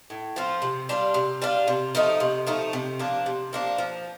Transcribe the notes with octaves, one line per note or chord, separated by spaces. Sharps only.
A2
F3 C4 F4
C3
G3 D4 F4
C3
G3 D4 F4
C3
F3 A3 D#4
C3
F3 A3 D#4
C3
F3 A#3 D4
C3
F3 A#3 D4
F3